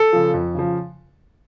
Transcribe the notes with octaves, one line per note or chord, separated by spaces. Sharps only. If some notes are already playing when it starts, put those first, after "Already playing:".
Already playing: A4
C#3 F3
F2
C#3 F3